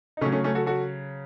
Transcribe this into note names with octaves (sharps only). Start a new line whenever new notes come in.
D#4
C#3 F#3 A3 C#4
A3 C#4
A3 C#4
F#4 A4
F#4 A4